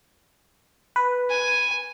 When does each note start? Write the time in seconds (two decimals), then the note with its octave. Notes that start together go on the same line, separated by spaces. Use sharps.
0.96 B4
1.30 G#5